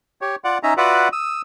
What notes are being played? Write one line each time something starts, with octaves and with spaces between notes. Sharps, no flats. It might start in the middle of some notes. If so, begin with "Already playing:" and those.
G4 C#5
F4 D5 F#5
C#4 D#4 E5 A#5
F4 F#4 B4 D5 E5 F#5
D#6 E6